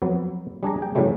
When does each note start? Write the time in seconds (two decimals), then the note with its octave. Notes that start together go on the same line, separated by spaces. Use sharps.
0.02 F2 F#3 B3
0.63 G3 D4 G#4 A#5
0.78 G#4 G5
0.95 A2 C#3 E3 F#3 G3 A3